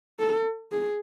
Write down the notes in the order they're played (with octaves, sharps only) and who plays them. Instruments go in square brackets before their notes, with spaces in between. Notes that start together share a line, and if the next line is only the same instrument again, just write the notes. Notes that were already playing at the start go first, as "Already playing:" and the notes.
[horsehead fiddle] A4
G#4